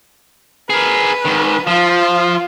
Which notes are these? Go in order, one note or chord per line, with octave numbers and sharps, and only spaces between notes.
G#4 A#4 B4
G#2 D#3
F3 F4